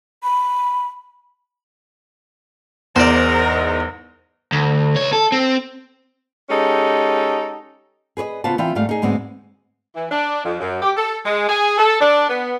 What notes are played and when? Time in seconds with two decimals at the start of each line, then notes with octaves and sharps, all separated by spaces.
0.23 B5
2.96 E2 G#2 A#4 C5 D5
4.52 D2
4.96 C#2 C#5
5.13 A4
5.32 C4
6.50 G#3 C#4 D#4 G4 A4
8.17 G#4 B4 C#5 D#5
8.44 C#3 B3 F4 F#4 C5 A5
8.58 E3 C4 F4 E5 G5
8.75 G#2 G3 A3 F5
8.89 D#4 G#4
9.02 D2 G#2 G#3 B3 C4
9.95 E3
10.11 D4
10.45 F2
10.61 F#2
10.82 G4
10.97 A4
11.25 G#3
11.49 G#4
11.78 A4
12.01 D4
12.30 B3